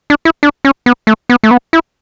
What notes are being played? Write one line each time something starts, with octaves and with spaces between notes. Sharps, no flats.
D4
E4
D4
C#4
B3
A3
B3
A3
B3
E4